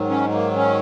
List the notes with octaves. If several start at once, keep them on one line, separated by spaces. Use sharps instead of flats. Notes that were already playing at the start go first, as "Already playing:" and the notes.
Already playing: G#2 D#3 F#3
C#4
A#3
C#4